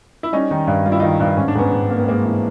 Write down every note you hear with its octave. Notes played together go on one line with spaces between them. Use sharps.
E4
G3 C#4 D#4
D#3
G2
G3 F4
E4
D#3 D#4 F4
G2
G#2 C#4
D4
G#2 B3 C#4
G#2
A#3 C4
B3
G#2 G#3 A#3
E3